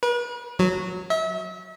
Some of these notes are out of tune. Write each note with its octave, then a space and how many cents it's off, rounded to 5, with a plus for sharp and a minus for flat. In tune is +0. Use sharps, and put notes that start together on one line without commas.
B4 -40
F#3 -10
E5 -35